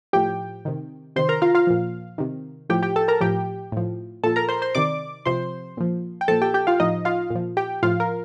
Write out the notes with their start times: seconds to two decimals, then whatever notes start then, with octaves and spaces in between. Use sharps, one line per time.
0.13 A2 F3 G4 G5
0.65 C3 D#3
1.16 C3 D#3 C5 C6
1.29 A#4 A#5
1.42 F4 F5
1.55 F4 F5
1.67 A#2 F3
2.18 C3 D#3
2.69 A2 F3 G4 G5
2.83 G4 G5
2.96 A4 A5
3.08 A#4 A#5
3.21 A2 F3 G4 G5
3.72 A2 F3
4.23 A#2 F3 A4 A5
4.36 A#4 A#5
4.49 C5 C6
4.62 C5 C6
4.75 C3 D#3 D5 D6
5.26 C3 F3 C5 C6
5.77 A#2 F3
6.21 G5
6.28 A#2 F3 A4 A5
6.42 G4 G5
6.54 G4 G5
6.67 F4 F5
6.80 A2 F3 D#4 D#5
7.05 F4 F5
7.30 A#2 F3
7.57 G4 G5
7.83 A2 F3 F4 F5
8.00 A#4